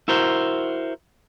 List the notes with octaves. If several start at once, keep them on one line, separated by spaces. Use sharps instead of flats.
E4 F#4 A#4 C5